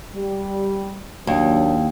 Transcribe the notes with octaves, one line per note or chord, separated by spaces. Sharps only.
G3
D#2 F#3 A#3 D4